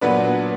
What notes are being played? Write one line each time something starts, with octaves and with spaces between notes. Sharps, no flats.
A#2 F#3 B3 D4 B4